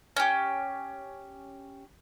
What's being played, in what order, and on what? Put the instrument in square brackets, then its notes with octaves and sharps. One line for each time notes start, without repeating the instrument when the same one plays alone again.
[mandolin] C#4 G4